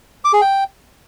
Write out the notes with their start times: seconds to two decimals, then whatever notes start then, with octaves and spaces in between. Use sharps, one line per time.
0.24 D6
0.33 G#4
0.41 G5